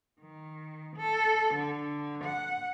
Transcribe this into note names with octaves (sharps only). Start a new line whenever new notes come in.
D#3
A4
D3
F#5